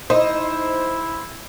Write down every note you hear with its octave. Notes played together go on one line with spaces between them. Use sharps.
D#4 E4 C5